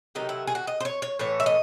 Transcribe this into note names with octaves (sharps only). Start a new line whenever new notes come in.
C3 D#3 F#3 A3 D#4
E4
G#4
F#4
D#5
C5
C#5
C#5
A2 E3 A3 C#5
E5
D#5